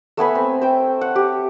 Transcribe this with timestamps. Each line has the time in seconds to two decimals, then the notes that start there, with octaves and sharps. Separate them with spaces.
0.17 A3 B3 G#5 B5
0.35 C4
0.61 C5 G5
1.01 F#5
1.15 G4